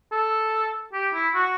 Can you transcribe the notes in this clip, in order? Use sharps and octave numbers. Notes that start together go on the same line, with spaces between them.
A4
G4
E4
F#4